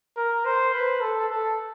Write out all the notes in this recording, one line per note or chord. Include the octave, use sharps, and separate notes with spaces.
A#4
C5
B4
A4
A4